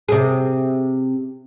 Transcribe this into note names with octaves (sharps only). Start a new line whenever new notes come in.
C3 G#4